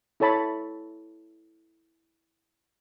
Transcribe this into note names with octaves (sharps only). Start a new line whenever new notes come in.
E4 A4 C#5 A5 B5